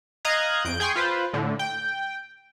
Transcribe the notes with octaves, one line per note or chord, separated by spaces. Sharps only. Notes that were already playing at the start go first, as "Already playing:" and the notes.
D#5 F5 A#5 F#6 G#6
F2 G6 D7
G#4 G5 G#5 C6 C#6
F4 B4 C5
A2 D3
G5